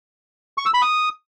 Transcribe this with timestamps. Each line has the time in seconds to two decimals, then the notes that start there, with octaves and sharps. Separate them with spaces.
0.58 C#6
0.66 E6
0.74 B5
0.82 D#6